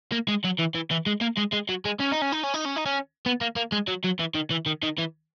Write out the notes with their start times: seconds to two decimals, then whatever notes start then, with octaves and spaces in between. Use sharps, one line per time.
0.12 A#3
0.28 G#3
0.44 F#3
0.59 E3
0.75 E3
0.91 E3
1.06 G#3
1.21 A#3
1.38 G#3
1.53 G#3
1.69 F#3
1.85 G#3
2.00 C#4
2.12 D#4
2.22 C#4
2.32 D#4
2.44 C#4
2.54 D#4
2.66 C#4
2.76 D#4
2.86 C#4
3.26 B3
3.41 A#3
3.56 A#3
3.72 G#3
3.88 F#3
4.04 F#3
4.19 E3
4.34 D#3
4.50 E3
4.66 D#3
4.83 D#3
4.98 E3